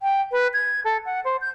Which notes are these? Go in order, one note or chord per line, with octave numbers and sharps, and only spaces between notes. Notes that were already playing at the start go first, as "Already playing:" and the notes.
G5
B4
G#6
A4
F#5
C5
G6